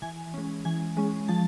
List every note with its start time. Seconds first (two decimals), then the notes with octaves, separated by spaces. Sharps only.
0.02 E3 G#5
0.34 G#3 C#4
0.65 E3 G#5
0.97 G#3 C#4
1.28 F3 A5